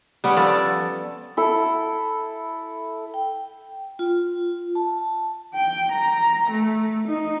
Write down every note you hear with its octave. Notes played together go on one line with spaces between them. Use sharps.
G3 B3 C#4
F3 A4 D5
E4 A4
G5
F4
A5
G5
A#5
A3
D#4